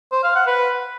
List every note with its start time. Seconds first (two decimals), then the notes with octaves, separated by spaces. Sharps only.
0.12 C5
0.23 F5
0.35 F#5
0.47 B4